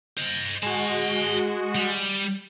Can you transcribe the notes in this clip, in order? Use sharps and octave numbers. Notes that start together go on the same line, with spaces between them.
C5 D#5
G#3 F#4 D#5 A5
G3